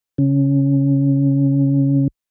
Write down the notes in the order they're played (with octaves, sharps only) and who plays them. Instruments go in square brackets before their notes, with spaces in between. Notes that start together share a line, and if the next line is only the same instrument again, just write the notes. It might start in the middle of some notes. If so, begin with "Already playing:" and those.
[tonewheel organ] C#3 C#4